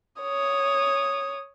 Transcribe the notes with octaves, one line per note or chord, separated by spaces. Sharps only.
C#5 D#6